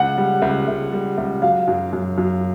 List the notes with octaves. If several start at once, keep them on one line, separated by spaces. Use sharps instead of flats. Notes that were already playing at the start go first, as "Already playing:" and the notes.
Already playing: C#2 F#5
G3
C#2
C#2
G3
C#2
F#3 F5
F#2
F#2
F#2